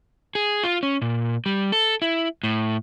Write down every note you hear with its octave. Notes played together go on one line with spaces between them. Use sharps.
G#4
F4
C#4
A#2
G3
A4
E4
A2